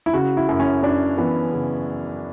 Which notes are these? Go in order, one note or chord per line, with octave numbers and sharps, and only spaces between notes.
E4
C#3 F#4
E4
F#2
C#4
F#2 D4
E3 B3
C#3